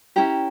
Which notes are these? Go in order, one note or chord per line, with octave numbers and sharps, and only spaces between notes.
C#4 E4 G4 A#5